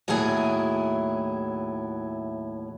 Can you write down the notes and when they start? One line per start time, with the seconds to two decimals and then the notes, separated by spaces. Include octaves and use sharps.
0.08 D#2 A2 F#3 E4 G#4 G#5